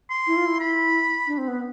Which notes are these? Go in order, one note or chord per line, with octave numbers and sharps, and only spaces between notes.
C6
E4
F4
E4
B5
D4
C4
B3